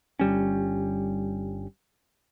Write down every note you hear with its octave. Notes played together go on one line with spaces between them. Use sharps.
G1 G3 C#4